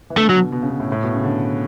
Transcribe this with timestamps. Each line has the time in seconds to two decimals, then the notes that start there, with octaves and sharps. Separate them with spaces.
0.10 E3
0.17 D3 A3
0.29 F#3
0.36 B2
0.52 B2
0.62 C#3
0.70 B2
0.80 A2
0.92 A2
1.03 B2
1.13 C#3
1.24 D3